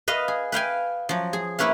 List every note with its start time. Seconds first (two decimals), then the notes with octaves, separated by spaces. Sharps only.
0.08 B4 D#5 F5
0.28 G#4
0.52 B4 F5 G5 G#5
1.09 F3 F#3
1.33 G#4
1.59 A#3 E4 B4 C#5 F5